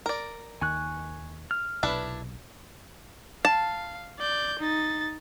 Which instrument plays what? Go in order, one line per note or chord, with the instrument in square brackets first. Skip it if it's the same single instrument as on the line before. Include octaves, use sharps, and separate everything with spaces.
[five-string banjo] A#4 D5
[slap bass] D#2 D#3 [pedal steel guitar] G#5 C#6 F#6
[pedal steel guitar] F6
[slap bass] B1 C3 [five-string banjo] D4 E4 B4
[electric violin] F5 [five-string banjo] A5
[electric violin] D5 G6
D#4 A6